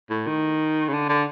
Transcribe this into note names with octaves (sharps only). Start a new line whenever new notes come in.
A2
D#3
C#3
D3
D3